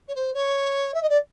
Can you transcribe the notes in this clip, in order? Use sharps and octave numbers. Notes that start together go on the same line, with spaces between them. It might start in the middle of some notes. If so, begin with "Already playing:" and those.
C#5
C5
C#5
E5
D#5
D5